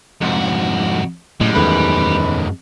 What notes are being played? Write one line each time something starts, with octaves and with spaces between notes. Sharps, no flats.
C2 F2 G#2 F#4
F#2 A2 G3 G#3
E2 D#3 A3 B4